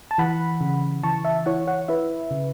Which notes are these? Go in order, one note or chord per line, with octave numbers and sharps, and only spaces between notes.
A5
E3 F#5 B5
C#3
E3 A5 C#6
E5 A5
E4 C#5 F#5
C#5 F#5
E4 B4 E5
C#3